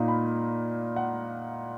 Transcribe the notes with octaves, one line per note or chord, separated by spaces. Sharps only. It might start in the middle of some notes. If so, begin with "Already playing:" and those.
Already playing: A#2 A#3 D#4
B5
F#5